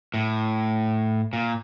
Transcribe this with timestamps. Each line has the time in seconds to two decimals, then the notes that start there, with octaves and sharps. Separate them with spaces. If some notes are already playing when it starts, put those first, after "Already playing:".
0.14 A2
1.33 A#2